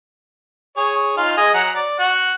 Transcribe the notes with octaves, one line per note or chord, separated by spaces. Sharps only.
G#4 C#5
D#4 F4 F5
G#4 D#5 G#5
F#3 F#5 A#5
D5
F#4 F#5